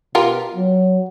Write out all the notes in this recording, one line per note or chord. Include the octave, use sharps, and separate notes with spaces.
B2 F4 G4 A#4
F#3